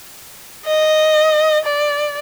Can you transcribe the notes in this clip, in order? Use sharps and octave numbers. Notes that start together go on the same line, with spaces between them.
D#5
D5